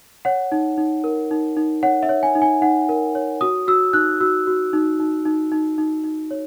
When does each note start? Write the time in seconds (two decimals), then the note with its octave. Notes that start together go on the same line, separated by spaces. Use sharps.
0.25 C#5 F#5
0.52 D#4
0.78 D#4
1.04 A#4
1.31 D#4
1.57 D#4
1.83 C#5 F#5
2.03 E5
2.09 C#5
2.23 G#5
2.35 D#4
2.42 G#5
2.61 D#4 F#5
2.89 A#4
3.15 C#5
3.41 F#4 D#6
3.68 F#4 E6
3.93 D#4 F#6
4.20 F#4 E6
4.47 F#4
4.73 D#4
5.00 D#4
5.25 D#4
5.52 D#4
5.78 D#4
6.04 D#4
6.31 C#5